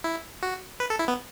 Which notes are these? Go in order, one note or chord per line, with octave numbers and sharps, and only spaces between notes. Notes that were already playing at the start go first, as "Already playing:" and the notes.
E4
F#4
B4
A4
E4
B3